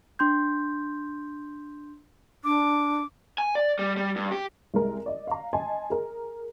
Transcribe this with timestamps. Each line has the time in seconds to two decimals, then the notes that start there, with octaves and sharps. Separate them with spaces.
0.19 D4 C6 G6
2.44 D4 D6
3.38 G#5
3.55 D5
3.79 G3
3.97 G3
4.16 G2
4.32 G4
4.74 C2 G#3 A#4
5.06 D5 D#5
5.27 F5 A#5
5.53 D#5 G#5 A5 C6
5.90 G#4 A#4